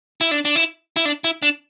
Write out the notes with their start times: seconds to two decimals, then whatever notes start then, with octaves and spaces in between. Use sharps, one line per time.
0.21 E4
0.31 D4
0.45 D4
0.56 E4
0.96 E4
1.05 D4
1.24 E4
1.42 D4